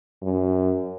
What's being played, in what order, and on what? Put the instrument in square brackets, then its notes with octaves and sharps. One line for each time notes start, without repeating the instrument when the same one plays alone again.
[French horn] F#2